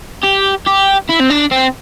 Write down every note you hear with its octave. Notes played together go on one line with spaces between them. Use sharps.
G4
G4
E4
C4
D4
C4